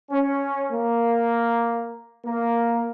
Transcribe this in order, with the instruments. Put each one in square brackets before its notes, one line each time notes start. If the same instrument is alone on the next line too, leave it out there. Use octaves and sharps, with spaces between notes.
[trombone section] C#4
A#3
A#3